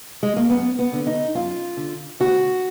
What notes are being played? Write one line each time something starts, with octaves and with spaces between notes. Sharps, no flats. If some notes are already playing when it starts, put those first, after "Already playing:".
G#3
A#3
F#2 B3
B3
D3
D#4
F#2 F4
D3
D2 F#4